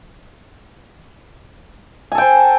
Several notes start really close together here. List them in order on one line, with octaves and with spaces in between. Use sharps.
G#5 A4 G5 C5